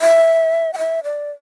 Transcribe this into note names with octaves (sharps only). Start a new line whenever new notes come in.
E5
G5
E5
D5